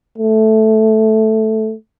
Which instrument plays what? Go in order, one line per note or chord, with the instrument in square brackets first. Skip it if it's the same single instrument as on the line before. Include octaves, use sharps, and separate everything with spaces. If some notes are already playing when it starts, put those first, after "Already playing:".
[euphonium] A3